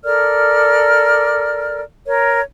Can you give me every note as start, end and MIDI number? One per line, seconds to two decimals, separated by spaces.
0.04 1.82 69
0.04 1.82 70
0.04 1.82 74
0.04 1.82 89
2.06 2.41 70
2.06 2.41 73